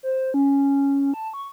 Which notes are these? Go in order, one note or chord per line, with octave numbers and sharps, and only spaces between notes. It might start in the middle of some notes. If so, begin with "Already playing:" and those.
C5
C#4
A5
C#6